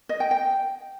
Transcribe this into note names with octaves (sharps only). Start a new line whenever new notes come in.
D#5
G5
G5